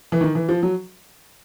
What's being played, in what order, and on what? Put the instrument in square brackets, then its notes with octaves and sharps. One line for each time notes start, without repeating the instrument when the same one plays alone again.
[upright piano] E3
D#3
E3
F3
F#3